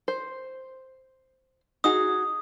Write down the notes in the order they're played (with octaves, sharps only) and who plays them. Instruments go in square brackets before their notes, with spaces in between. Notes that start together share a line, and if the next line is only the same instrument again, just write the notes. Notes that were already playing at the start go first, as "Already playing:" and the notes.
[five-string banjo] C5
[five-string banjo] D#4 F#4 G#4 [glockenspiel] D#6